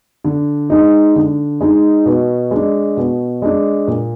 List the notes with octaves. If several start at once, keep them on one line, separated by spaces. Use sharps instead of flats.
D3
G#3 D#4
D3
G#3 D#4
B2
G#3 D4
B2
G#3 D4
A#2